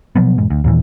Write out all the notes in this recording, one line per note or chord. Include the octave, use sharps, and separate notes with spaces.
B2 F3 F#3 B3
E1 G#2
D2
D#2 A#2 E3